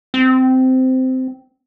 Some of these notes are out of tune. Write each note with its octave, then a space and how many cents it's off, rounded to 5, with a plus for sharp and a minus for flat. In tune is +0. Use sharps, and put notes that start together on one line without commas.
C4 -15